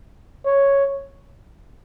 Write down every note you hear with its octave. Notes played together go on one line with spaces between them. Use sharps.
C#5